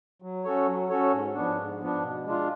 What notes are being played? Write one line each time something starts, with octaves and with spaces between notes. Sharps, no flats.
F#3
C#4 F#4 A4 C#5
F#3
C#4 F#4 A4 C#5
G#2
F3 B3 D4
G#2
F3 B3 D4
B2
G#3 D4 F4